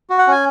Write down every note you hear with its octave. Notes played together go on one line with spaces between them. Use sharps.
F#4
F#5
C#4 G#5